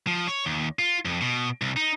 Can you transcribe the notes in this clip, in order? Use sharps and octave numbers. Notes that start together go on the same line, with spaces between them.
F3
C#5
D#2
F4
F2
B2
C2
D#4